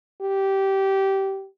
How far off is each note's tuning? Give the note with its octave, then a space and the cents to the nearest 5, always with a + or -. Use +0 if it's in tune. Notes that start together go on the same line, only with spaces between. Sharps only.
G4 -15